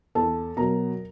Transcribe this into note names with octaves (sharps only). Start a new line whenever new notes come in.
E2 A4 A5
B2 F#3 A#4 A#5